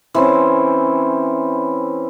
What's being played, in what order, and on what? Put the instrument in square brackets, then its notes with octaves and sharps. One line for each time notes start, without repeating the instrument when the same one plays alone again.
[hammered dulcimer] E3 C4 C#4